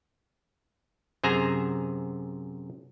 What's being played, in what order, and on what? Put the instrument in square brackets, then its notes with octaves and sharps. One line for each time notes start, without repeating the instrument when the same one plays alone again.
[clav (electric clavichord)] F#2 C3 G#4 C5 G#5 A#5